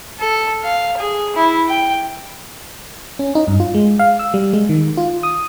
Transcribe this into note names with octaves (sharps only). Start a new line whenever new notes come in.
A4
F5
G#4
E4
G5
C#4
D#4
G2
F4
G#3
F5
E6
G3
G#3
D#3
F4
D#6